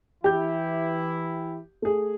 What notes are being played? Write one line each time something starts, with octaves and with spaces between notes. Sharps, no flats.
E3 E4 G4 G6
A3 G#4